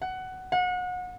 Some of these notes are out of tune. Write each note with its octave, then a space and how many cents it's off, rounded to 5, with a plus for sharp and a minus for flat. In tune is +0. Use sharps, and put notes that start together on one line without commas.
F#5 +15
F#5 -30